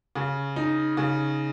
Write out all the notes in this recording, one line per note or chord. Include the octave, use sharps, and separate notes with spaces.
C#3
D#4
C#3